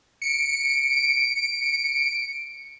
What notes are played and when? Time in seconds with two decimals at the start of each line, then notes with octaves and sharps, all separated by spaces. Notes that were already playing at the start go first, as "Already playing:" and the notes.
0.22 C#7 D7